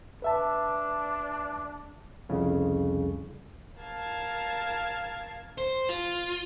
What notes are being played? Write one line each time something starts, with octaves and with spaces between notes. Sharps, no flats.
D4 B4 E5 A5
C2 F2 C#3
A#4 F5 A5 G#6
C5
F4